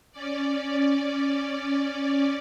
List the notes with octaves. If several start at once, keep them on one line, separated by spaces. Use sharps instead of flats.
C#4 D5